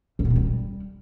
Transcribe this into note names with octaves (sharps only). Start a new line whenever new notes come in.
G2
B2
G2
G3